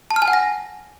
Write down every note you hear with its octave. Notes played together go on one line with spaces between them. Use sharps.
A5
F6
G#5
F#5
A#6